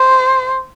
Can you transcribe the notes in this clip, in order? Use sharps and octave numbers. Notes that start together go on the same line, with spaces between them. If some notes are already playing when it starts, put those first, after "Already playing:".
Already playing: C5